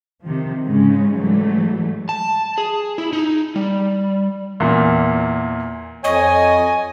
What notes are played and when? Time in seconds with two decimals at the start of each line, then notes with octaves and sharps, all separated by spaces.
0.23 C3 D#3 F3
0.66 G#2 C#3 G#3 C#4
1.14 G#2 E3 F#3 G3 A3
2.09 A5
2.58 G#4
2.98 E4
3.13 D#4
3.56 G3
4.60 E2 A#2
6.04 F2 C#5 D#5 G#5